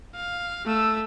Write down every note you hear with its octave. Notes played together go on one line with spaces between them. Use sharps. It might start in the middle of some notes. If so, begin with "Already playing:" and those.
F5
A3 E6